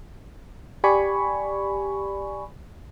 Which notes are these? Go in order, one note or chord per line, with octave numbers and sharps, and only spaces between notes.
G4 D5 G#5 B5 C#6